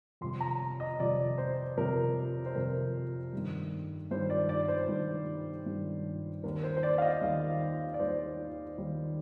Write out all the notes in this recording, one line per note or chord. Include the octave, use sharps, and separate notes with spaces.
F2 C3 G3 C6
A#5
D#5
F2 C3 G3 D5
C5
F2 C3 G3 A#4
C5
F2 C3 G3 A#4
G2 D#3 G3
G2 D#3 G3 C5
D5
D5
C5
G2 D#3 G3
G2 D#3 G3
D#2 D#3 G3 A#4
C5
C5
D5
F5
D#5
D#2 D#3 G3
D5
D#2 D#3 G3 C5
D#2 D#3 G3